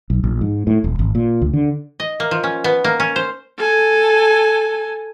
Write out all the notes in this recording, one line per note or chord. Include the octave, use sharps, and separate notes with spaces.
B1
A#1
G#2
A2
D#1
G#1
A#2
D2
D3
D#5
A#3
F3
C#4
B3
A#3
C#4
C5
A4 G#5